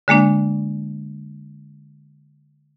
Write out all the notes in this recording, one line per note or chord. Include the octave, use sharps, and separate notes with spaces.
D3 G#3 A#3 D4